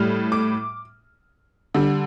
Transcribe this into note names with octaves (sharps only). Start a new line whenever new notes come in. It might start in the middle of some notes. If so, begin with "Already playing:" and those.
Already playing: A2 G3 F6
D6
D3 G3